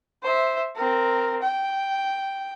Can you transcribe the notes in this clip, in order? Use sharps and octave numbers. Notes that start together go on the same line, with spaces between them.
C5 E5
C4 A#4
G5